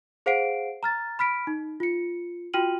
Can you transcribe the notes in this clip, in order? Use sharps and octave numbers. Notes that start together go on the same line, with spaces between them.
G#4 C5 F5 F#5 C7 D7
A#5 F6 A6
B5 F6 B6 D7
D#4
F4 C#7
F4 F#4 G5 F6 D#7 F#7